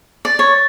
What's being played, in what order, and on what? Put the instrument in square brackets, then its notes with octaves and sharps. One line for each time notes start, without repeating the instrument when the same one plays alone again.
[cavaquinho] D5 [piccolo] A6
[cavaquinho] C#5